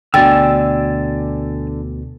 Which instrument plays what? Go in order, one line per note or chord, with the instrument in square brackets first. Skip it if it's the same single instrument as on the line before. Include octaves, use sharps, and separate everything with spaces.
[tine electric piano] D2 B2 [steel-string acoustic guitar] D3 [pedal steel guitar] D5 G#5 E6 [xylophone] G5 A6